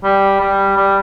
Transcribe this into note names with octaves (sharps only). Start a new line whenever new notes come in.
G3
G3
G3